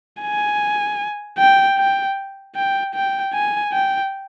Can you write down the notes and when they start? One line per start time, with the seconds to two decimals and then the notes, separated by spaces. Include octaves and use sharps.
0.22 G#5
1.38 G5
1.78 G5
2.56 G5
2.95 G5
3.34 G#5
3.73 G5